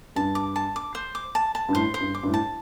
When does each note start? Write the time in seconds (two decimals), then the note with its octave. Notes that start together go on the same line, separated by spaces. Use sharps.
0.16 G2 A5
0.35 D6
0.56 A5
0.76 D6
0.95 C5
1.15 D6
1.35 A5
1.55 A5
1.69 G2
1.74 A2 C5
1.94 C5
2.00 G2
2.15 D6
2.23 G2
2.27 A2
2.34 A5